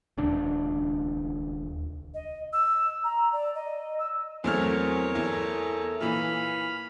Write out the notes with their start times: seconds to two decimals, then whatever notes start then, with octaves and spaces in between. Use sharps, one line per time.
0.18 D#1 C#2 D4
2.14 D#5
2.53 E6
3.04 A#5
3.33 D5
3.55 D#5
3.99 E6
4.44 E2 F#3 A3 C4 A#4 C5 C#5 F6
5.15 E2 A4 E5
6.01 A#2 E3 B5 F6